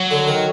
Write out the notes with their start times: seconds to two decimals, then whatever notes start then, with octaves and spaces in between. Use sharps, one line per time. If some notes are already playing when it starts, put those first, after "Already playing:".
Already playing: F#3
0.11 D3
0.27 D#3